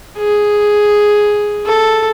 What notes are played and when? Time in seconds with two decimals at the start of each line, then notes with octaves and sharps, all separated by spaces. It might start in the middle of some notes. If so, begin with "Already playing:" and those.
0.18 G#4
1.66 A4